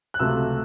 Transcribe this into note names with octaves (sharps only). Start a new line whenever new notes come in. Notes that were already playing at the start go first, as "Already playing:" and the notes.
F#6
C#2 C3 F#3 A3 E6